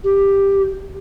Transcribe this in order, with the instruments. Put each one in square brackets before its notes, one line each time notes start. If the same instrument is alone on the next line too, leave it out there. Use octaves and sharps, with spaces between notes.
[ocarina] G4